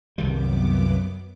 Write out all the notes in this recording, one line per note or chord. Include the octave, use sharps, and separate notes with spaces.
C2 F#2 D#3 G3 B3 D6